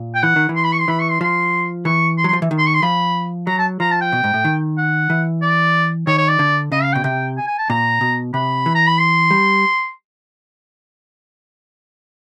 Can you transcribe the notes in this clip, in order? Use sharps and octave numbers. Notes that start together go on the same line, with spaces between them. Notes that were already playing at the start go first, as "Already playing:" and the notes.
Already playing: A#2
G5
E3 F#5
D#3
E3
C6
B5
C#6
C6
E3 B5
C#6
C6
F3 C6
E3 C#6
C6
F#3
C6
F3
E3
D#3
C6
C#6
C6
F3 B5
F#3 A#5
A5
F3 A#5
A5
G5
B2
G#2
A2
D#3
F#5
E3
D5
D#3 C#5
C#5
D5
D3
C#3 D#5
F5
B2 G5
C3 G5
G#5
G#5
A5
A#2 A#5
B2
C3 B5
E3
A#5
B5
C6
G3